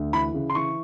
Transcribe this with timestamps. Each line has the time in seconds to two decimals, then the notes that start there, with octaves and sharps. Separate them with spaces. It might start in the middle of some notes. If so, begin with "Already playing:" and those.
Already playing: D2
0.13 E3 B5
0.34 C#3
0.50 C6
0.55 E3 C#6